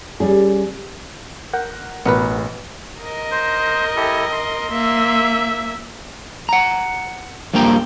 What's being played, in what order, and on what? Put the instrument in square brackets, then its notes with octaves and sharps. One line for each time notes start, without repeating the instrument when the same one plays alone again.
[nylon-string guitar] G3 C#4 G#4
[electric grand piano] A#4 F#5 G6
[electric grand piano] A1 B2 C#7 [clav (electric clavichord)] B3 A#4 B4
[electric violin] A#4 D#5
[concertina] C5
E4 G4 A4
C6
[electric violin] A#3 E5
[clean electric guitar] F#5 A#5
G2 F3 A#3 G5 A#5